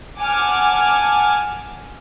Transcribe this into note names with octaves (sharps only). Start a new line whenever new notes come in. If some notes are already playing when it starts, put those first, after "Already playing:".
F#5 G#5 A5 D6 F6 G#6